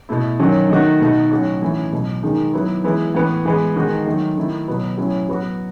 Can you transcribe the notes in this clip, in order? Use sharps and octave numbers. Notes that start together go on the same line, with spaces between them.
B2 A3 E4
D#3 F#3 C#4 F#4
D#3 A3 D#4 F#4
B2 A3 D#4 F#4
A2 F#3 C#4 F#4
A2 E3 A3 C#4 E4
B2 F#3 A3
D#3 G#3 D#4
F#3 B3 E4
E3 G#3 B3 E4
A2 E3 B3
E3 G#3 B3
D#3 G#3 D#4 F#4
D#3 F#3 A3
D#3 A3 E4
B2 F#3 B3
A2 F#3 C#4 E4
F#3 B3 F#4